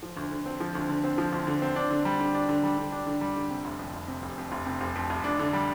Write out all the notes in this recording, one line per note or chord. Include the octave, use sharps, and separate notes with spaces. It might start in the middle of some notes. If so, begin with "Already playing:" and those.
F3
D2
D3
C4
F3
D2
D3
C4
F3
D2
D3
C4
D4
D3
G3
D3
D4
D3
G3
D3
D4
D3
G3
D3
C3
F1
F2
F1
C3
F1
F2
F1
C3
F1
F2
F1
D4
D3
G3